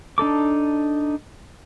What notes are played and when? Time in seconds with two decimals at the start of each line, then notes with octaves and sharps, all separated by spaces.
0.18 D4 D#4 A4 D6